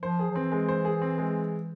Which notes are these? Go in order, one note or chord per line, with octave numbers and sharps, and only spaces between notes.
F3 C5
G#4
F3
E3 C4
G#3
C5
G#4
C4
G#3